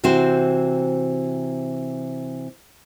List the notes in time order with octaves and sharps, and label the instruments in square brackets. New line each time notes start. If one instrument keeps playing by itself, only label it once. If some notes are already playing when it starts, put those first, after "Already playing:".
[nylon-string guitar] C3 E3 C4 F#4 C5